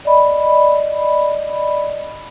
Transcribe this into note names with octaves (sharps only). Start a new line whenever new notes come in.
D5 D#5 B5